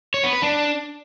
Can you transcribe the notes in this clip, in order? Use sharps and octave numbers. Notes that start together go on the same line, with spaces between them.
C#5
B3
B4
D4